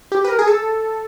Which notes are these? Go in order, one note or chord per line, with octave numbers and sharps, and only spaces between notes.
G4
B4
A#4
G#4
A4